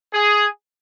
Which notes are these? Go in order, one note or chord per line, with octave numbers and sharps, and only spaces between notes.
G#4